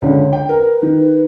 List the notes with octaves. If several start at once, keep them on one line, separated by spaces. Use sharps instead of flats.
C#2 D3 C#5
G5
A#4 B4
D#3